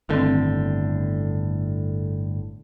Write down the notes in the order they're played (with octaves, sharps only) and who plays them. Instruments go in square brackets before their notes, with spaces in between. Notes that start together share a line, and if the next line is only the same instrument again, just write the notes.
[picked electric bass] G1 A2 D3 [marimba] D#3 C4